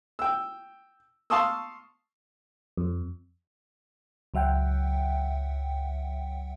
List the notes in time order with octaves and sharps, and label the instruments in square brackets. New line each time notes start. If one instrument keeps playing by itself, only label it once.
[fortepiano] G5 E6
F5 A5 C6 C#6 D#6 E6
[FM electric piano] F2
C#2 F#3 E5 F#5 G5